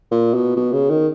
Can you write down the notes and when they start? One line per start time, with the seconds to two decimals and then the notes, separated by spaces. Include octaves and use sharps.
0.11 A#2
0.34 B2
0.56 B2
0.73 C#3
0.90 D#3